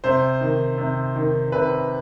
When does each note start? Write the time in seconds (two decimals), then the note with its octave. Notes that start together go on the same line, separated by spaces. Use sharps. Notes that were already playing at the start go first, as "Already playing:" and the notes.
0.04 C3 C5
0.41 D#3
0.78 C3
1.16 D#3
1.52 C3 B4